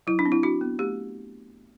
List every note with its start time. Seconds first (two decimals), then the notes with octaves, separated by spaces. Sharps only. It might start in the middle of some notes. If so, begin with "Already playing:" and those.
0.07 F#3 E4
0.19 D4
0.25 C4
0.32 E4
0.43 D4 F#4
0.61 B3
0.79 A3 G4